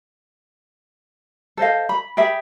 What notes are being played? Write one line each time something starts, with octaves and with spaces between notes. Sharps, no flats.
A4 C5 D#5 F5
B5
G4 G#4 E5 B5